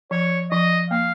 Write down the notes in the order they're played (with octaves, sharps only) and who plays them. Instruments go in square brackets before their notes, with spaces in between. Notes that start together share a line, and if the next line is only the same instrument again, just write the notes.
[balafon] F3 [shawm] C#5
[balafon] F3 [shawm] D#5
[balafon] A#3 [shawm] F5